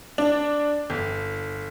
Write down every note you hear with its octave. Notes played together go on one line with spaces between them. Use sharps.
D4
G1